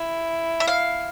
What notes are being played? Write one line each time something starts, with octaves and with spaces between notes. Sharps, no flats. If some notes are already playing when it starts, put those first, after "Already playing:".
Already playing: E4
E5
F5